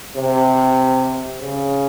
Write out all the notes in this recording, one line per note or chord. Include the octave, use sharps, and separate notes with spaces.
C3
C#3